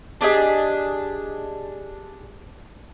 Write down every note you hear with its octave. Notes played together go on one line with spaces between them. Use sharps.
D4 G4 G#4 D#5